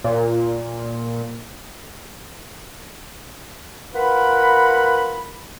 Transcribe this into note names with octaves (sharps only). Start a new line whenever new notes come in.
A#2
F4 A#4 B4 F#5 B5